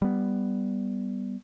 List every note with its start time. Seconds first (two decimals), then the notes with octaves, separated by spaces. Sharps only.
0.02 G3 B3